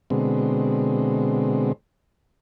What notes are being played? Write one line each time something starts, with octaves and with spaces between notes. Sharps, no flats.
B2 D3 G#3 C4